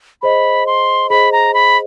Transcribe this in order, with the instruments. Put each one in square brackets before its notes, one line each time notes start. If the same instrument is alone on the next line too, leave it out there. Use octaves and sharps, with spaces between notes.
[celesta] G#4 C5 D#5 [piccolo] B5
[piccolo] C6
[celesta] G#4 C5 D#5 [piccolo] B5
[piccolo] A#5
B5